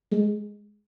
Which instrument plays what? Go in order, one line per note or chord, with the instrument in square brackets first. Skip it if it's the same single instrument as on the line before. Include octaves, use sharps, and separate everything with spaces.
[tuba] G#3